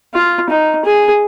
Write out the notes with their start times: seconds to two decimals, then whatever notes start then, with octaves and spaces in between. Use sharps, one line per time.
0.15 F4
0.50 D#4
0.85 G#4